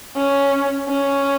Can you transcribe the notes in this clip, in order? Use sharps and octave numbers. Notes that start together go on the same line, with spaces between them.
C#4
C#4